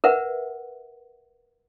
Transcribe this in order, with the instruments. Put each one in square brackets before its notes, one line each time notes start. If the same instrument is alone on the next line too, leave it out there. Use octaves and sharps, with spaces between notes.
[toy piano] A#4 B4 E5 F#5